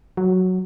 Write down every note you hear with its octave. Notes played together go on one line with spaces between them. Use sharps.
F#3